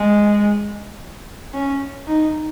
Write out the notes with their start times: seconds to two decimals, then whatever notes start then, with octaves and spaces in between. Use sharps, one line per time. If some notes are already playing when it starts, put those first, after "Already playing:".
Already playing: G#3
1.54 C#4
2.07 D#4